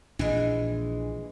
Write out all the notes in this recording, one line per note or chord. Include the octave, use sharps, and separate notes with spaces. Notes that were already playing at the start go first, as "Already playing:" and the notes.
A#1 A#2 E3 G#3 D4